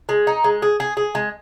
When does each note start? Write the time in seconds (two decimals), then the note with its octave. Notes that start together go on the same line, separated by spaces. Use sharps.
0.09 G#3
0.27 D#4
0.44 G#3
0.62 G#4
0.80 G#4
0.97 G#4
1.15 G#3